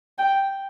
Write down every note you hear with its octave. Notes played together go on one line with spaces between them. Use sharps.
G5